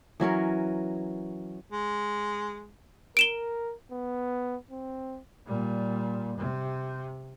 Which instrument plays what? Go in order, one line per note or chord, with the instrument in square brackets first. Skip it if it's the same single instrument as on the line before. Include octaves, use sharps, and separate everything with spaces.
[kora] E3 F#3 C#4 A#4
[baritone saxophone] G#3
[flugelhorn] A#4 [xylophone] D7 E7 G7
[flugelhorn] B3
C4
[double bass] A#2 G3
C3